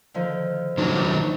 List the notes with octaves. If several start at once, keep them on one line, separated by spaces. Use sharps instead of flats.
D3 D#3 F3
D#3 F#3 D4 C#5